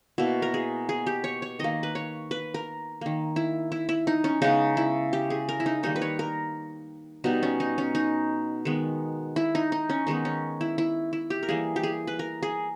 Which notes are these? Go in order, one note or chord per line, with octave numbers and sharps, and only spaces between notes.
B2 A#3 E4
A#4
G#4
G#4
G4
C#5
C#5
D#3 A#3 D#5
B4
C#5
B4
A#4
D#3 A#3
E4
E4
E4
D#4
C#4
C#3 G#3 B3 D#4
E4
G4
G#4
A#4
E4
D#4
D#3 G3 A#3 D#4
B4
C#5
A#4
B2 G3 B3 D#4
C#4
D#4
C#4
D#4
D#3 G#3 B3
E4
D#4
D#4
C#4
D#3 G#3 B3 D#4
C#4
E4
E4
E4
G4
A#4
E3 G3 A#3 G#4
G4
G#4
B4
A#4
G#4